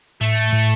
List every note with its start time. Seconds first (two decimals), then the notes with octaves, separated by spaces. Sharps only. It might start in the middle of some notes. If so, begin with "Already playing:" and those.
0.21 A2 A3
0.53 A2